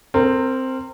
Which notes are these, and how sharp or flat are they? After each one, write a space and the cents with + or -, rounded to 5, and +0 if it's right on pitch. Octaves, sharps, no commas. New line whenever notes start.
C4 +0 A#4 -25